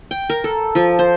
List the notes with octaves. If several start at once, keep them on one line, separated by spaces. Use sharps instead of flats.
G5
A#4
A4
F3
C5